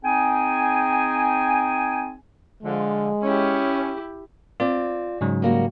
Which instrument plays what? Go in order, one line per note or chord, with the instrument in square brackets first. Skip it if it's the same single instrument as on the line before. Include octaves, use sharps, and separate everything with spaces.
[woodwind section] C4 D#4 G#4 G5 G#5
[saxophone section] D3 F3 [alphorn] G#3
[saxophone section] C#4 [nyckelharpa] E4 G4
[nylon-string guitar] C4 D5 [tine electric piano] F4
[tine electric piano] G#2 C#3 F#3
[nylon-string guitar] G3 A#3 F#4